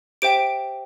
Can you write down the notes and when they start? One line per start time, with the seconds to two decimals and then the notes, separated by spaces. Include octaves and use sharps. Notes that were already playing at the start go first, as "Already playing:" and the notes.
0.22 G4 C5 E5 G5 D7